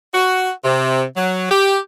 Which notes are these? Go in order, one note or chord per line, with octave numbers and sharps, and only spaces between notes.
F#4
C3
F#3
G4